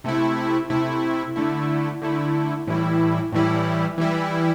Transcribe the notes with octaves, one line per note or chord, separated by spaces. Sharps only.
C3 A3 E4
C3 A3 E4
D3 A3 E4
D3 A3 E4
A2 E3 G3 E4
A2 E3 G3 E4
E3 G3 E4